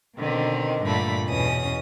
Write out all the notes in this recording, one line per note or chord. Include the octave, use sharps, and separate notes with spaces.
B2 D3 D#3 C4
G2 A#2 D3 A3 B5
E2 B2 C#4 D#6